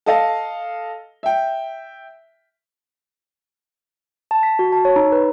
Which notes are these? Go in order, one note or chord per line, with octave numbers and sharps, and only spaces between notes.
A4 D#5 F5
E5 G5
A5
B6
F#4
A5
C#5
D#4
B4